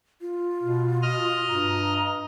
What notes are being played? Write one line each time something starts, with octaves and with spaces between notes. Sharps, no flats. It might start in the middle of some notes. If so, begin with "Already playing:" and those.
F4
B2
D#5 F6
G2 A#5